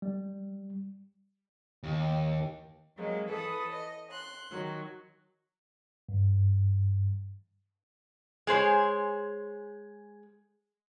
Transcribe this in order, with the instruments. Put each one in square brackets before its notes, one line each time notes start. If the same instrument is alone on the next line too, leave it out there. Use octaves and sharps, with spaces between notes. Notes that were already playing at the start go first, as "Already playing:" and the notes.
[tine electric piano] G3
[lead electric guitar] D#2
[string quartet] F#3 G#3 A#3 C4
E3 A4 B4 D#6
D#5
C6 F#6
D#3 F#3
[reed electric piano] G2
[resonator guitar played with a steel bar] G#3 G#4 C5 C#5